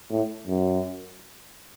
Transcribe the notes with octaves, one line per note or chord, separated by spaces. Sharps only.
A2
F#2